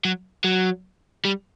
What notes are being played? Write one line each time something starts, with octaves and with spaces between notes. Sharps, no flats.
F#3
F#3
G3